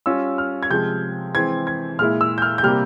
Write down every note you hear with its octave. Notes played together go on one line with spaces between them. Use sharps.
G3 C#4 F4 E6
F6
G#6
C3 F3 G#3 G6
E3 G#3 C4 G#6
G#6
A#2 G#3 E4 F6
E6
G6
F6
G6
C3 G3 A#3 F6